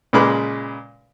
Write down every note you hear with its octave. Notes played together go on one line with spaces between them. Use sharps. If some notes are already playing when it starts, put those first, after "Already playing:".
A#2 C#3 G#3 B4 B5 D6